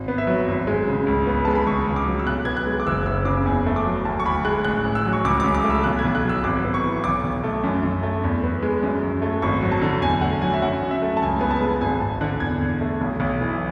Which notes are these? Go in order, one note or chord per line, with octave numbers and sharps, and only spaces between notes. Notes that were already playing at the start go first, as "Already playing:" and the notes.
Already playing: G#1
B3
E5
F#3
G#1
G#3
C#3
C#2
B3
G#3 A5
B5
C#2 C#6
C#2
D6
F#3
E6
B1 F#6
B3 G#6
F#6
G#3
D6
F#1 E6
F#1 E6
C#3 D6
E2 G#5
A3
D6
F#3
D2 A5
C#6
D2 B5
G#3 F#6
A1 F#6
A1
E6
F#3
C#6
C#2 D6
D6
C#2
D6
A3
E6
B1 F#6
G#6
B1
F#6
F#3 E6
G#1 D6
B3
C#6
E3
B1 D6
B1
A3
F#2
F#2
A3
E2
B3
G#3
F#2
F#2
A3
G#1 C#6
F#3
A5
D3
E2 G#5
A3 F#5
F#3 G#5
E5
F#2 F#5
F#2
E5
A3
A5
C#2 G#5
B3 G#5
A5
G#3
G#1 G#5
G#1 A5
D3 F#6
E2 G#6
E2
A3
B1
B1
E3